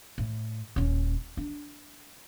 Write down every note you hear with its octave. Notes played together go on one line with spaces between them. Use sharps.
A2
D#1 C#4
D4